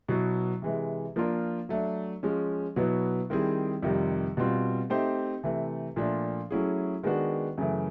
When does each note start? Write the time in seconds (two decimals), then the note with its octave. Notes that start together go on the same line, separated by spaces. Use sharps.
0.08 B2 F#3 B3 E4
0.62 C3 E3 G#3
1.16 F3 A#3 D4 F4 A#4
1.69 F#3 A3 D4
2.23 F3 G#3 C#4
2.76 B2 F#3 B3 E4
3.30 D#3 G3 C4 E4 G#4
3.83 F2 C3 D#3 G3
4.37 B2 G3 C4 F4
4.90 A3 C4 D#4 G4 C5
5.43 C3 E3 A3
5.96 A#2 F3 A3 D4
6.51 F#3 A3 C#4 E4 G#4
7.03 D#3 G#3 B3 D4 F#4
7.58 F#2 C#3 E3 A3